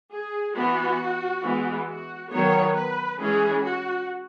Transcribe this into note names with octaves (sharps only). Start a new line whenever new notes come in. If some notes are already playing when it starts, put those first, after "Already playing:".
G#4
E3 B3 F#4
E3 G#3 B3
F#4
D#3 F#3 B3 C#5
B4
E3 G#3 C#4 G#4
F#4